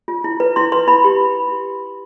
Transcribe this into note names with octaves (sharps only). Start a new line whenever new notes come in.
F4
E4
B4
E4 C6
B4 C6
E4 B5
G4